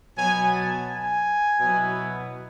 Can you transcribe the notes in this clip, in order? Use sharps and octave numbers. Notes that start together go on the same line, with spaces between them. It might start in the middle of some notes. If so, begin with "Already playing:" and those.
B2 F#3 B3 G#5
A5
G#5
B2 F#3 B3 E4